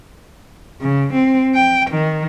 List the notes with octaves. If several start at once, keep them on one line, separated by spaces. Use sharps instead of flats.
C#3
C4
G5
D#3